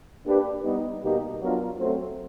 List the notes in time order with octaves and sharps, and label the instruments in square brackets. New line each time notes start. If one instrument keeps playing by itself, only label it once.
[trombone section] A#3 D4 G4 B4
G3 B3 D#4
B2 G3 A#3 D#4 G4
F#3 B3 D4 F4 A#4
F#3 A3 C4